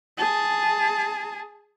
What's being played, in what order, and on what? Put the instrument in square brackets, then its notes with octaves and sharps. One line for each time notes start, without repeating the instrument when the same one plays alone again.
[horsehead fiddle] G#4 A5